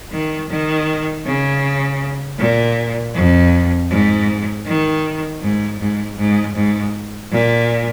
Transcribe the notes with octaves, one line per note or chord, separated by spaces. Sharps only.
D#3
D#3
C#3
A#2
F2
G#2
D#3
G#2
G#2
G#2
G#2
A#2